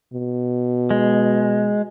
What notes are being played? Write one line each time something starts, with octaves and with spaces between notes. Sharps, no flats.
B2
G#3